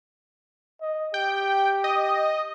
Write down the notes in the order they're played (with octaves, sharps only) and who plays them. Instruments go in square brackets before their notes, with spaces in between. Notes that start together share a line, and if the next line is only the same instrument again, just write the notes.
[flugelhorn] D#5
[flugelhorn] G4 [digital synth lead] G5
[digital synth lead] D#5